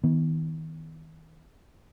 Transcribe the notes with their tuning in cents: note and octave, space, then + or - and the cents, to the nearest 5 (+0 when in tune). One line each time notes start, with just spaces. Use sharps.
D#3 +40 B3 +0